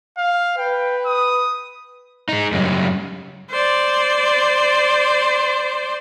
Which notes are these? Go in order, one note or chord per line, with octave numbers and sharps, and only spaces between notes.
F5
B4 G5
D#6
G#3 D#4
F#2 C#3 F#3 G3
C5 D5